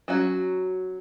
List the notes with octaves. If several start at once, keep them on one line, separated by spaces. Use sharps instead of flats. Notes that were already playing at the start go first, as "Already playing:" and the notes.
F#3 C#4 F#4